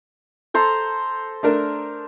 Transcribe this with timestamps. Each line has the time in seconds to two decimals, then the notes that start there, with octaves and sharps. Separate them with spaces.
0.54 A4 C5 A#5
1.43 A3 D4 A#4